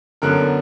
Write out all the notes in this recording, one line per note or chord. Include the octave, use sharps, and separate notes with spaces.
F#2 D3 F#3 B3 A#4